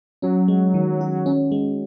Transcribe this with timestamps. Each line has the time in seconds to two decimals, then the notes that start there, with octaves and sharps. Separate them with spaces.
0.22 F#3 C#4
0.48 G#3
0.74 D#3
1.01 F#4
1.26 C#4
1.52 G#3